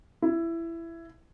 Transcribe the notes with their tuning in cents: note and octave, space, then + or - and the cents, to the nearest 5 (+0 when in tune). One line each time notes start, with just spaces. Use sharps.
E4 +15